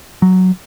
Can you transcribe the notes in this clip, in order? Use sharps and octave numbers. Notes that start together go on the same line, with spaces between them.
F#3